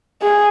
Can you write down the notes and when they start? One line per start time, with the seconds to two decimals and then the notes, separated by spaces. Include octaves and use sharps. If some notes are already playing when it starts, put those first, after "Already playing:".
0.22 G#4